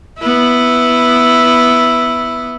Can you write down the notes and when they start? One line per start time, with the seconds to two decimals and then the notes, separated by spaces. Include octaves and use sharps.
0.19 B3 E4